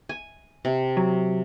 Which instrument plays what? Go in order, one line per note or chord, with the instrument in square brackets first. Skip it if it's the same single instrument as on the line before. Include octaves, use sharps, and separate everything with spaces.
[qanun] G#5
C3
[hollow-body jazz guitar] F#3